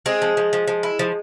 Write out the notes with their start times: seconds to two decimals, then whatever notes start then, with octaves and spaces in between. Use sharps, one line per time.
0.06 G#3 C4 G#4
0.22 F3
0.37 F3
0.53 F3
0.68 F3
0.83 E4
0.99 F3